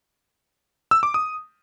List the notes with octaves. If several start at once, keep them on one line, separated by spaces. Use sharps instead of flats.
E6
D6
D#6